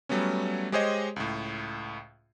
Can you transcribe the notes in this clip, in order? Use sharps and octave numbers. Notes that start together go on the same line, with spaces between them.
F#3 G3 A3 B3 C#4
G#3 G4 G#4 C5 C#5 D#5
C#2 A2